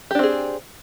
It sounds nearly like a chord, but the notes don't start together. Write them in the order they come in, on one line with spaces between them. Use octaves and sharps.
G4 D4 C4 G#4